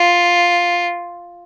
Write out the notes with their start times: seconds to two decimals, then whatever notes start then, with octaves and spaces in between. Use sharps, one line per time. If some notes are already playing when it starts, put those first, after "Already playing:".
Already playing: F4